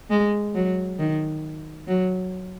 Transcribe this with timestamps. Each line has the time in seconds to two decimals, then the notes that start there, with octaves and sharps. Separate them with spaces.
0.10 G#3
0.55 F#3
0.99 D#3
1.88 F#3